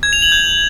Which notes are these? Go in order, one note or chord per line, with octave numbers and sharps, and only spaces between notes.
G#6
F7
F#7
G6